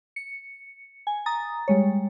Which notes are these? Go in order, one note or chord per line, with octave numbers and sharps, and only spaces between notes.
C#7
G#5
A#5 D#6 A6
G3 G#3 C#5